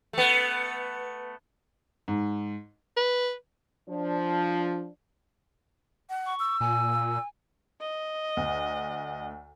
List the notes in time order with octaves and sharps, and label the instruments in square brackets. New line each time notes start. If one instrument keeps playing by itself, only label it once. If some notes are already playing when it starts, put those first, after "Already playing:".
[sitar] A3 B3
[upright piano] G#2
[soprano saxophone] B4
[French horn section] F3 D4
[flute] F#5
[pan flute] C#6
[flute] E6
[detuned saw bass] A#2 [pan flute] G#5
[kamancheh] D#5
[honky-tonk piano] D2